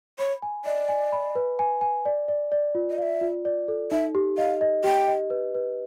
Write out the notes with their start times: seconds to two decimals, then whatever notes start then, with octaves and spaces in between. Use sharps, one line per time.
0.19 C#5 B5
0.42 G#5
0.65 D5 D#5
0.89 G#5
1.12 B5
1.35 B4
1.59 G#5
1.81 G#5
2.05 D5
2.28 D5
2.52 D5
2.75 F4
2.90 D#5
2.98 D5 F5
3.02 E5
3.21 F4
3.45 D5
3.68 A4
3.91 D#4 E5
4.15 G4
4.38 D#5 F5
4.61 D#5
4.84 G4 G5
5.08 D#5
5.30 B4
5.55 B4